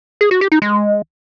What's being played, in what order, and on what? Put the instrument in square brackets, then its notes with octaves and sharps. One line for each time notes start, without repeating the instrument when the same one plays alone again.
[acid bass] G#4
F#4
G4
D#4
G#3